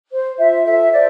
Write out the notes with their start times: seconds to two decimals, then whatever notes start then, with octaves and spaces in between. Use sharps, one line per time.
0.12 C5
0.38 F4 E5
0.65 A4 E5
0.92 C5 D5